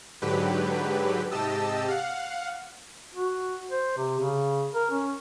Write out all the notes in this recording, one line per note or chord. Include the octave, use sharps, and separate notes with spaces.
G#2 D3 F#3 G4 B4
G#2 C3 G4 D#5 A5 E6
F5 F#5
F#4
C5
C3
C#3
A#4
C#4